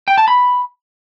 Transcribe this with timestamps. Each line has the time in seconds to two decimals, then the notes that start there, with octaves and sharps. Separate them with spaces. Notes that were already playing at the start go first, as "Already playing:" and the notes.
0.08 G5
0.18 A5
0.28 B5